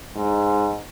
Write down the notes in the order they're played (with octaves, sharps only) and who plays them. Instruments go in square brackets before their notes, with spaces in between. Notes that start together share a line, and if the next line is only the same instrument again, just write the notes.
[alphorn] G#2